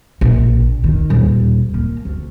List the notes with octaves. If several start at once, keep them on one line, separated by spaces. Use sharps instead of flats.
A#1
D#3
D#1
A#3
D2